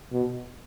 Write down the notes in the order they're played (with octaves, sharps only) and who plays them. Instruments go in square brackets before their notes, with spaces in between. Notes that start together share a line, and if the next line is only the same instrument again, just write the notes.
[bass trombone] B2